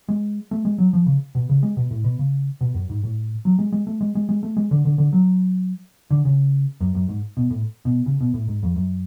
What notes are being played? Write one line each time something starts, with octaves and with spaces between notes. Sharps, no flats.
G#3
A3
G#3
F#3
F3
C#3
B2
C#3
G#3
B2
A2
B2
C#3
B2
F#2
G#2
A2
F#3
G#3
G#3
A3
G#3
G#3
G#3
A3
G#3
D3
D3
D3
F#3
D3
C#3
F#2
F#2
G#2
B2
A2
B2
C#3
B2
A2
G#2
F2
F#2